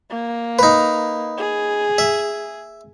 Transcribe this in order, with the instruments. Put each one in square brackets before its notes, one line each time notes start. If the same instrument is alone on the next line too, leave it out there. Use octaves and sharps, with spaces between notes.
[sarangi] A#3
[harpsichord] D#4 B4
[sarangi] G#4
[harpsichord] E5